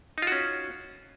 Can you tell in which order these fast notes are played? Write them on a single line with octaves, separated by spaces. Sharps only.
D#4 F4 F#4 C#4